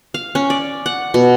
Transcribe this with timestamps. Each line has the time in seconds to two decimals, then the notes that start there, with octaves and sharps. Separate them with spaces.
0.14 F5
0.35 C#4
0.50 D5
0.86 F#5
1.14 B2